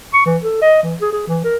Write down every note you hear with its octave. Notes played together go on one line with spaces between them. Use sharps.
C#6
E3
A4
D#5
E3
G#4
G#4
E3
A#4